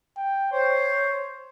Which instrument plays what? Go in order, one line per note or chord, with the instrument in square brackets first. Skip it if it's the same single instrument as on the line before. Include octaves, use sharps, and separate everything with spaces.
[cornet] G5
[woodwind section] C5 [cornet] C#5